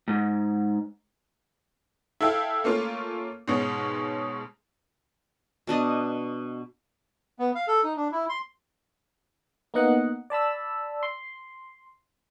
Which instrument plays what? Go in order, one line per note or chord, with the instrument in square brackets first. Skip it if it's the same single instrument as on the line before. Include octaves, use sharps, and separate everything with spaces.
[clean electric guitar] G#2
[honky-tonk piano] E4 A4 E5 F5 G5
A3 A#3 C#4 F4
G#2 B2 G#3 C#4
[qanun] B2 D4 D#5
[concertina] B3
F5
A4
D#4
D4
E4
C6
[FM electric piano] A#3 B3 D#4 D#5 F#5
D5 A5 B5 E6
C6